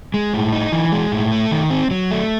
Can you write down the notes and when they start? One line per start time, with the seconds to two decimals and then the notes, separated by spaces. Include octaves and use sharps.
0.14 G#3
0.34 A2
0.53 D#4
0.72 E3
0.92 G#3
1.12 A2
1.32 A3
1.51 D#3
1.70 C4
1.91 F#3
2.11 A3